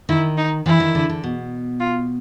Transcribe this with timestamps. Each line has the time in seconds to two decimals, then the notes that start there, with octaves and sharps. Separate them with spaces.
0.09 D#3 E4
0.38 D#4
0.66 E3 E4
0.80 D#3
0.95 D3
1.09 D3
1.24 B2
1.80 F4